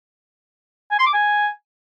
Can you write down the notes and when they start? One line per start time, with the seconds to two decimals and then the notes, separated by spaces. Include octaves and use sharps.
0.91 G#5
0.99 C6
1.06 D6
1.14 G#5